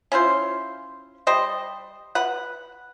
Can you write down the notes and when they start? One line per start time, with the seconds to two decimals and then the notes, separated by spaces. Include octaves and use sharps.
0.12 C#4 E4 F4 C5
1.27 G3 C5 D#5
2.15 B4 F#5